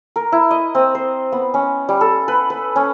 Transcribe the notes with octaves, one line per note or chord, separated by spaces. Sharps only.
A#4
E4
D#5
C4
C5
B3
C#4
G3
A4
B4
B4
C#4